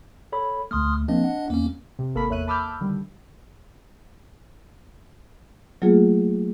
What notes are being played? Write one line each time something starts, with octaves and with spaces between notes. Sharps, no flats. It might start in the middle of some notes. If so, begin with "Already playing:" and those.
A4 C#5 B5
D2 A3 C6 D#6 F6
F3 A#3 C4 D4 D#5
F#5
E2 A#3 C#4
C3
G#1 A#3 A4 A#4 B5 B6
E2 C#5 E5 F#6 D#7
A5 B5 D6 E6 F6 G6
D3 D#3 G3
F#3 A3 A#3 F4 G#4